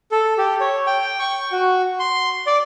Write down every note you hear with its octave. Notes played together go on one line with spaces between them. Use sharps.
A4
G4
C#5
G5
C#6
F#4
C6
D5